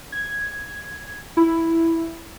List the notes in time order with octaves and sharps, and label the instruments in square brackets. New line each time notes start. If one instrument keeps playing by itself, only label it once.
[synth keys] G#6
E4